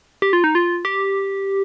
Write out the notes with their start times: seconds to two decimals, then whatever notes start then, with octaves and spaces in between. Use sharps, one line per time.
0.22 G4
0.33 F4
0.44 D#4
0.55 F4
0.85 G4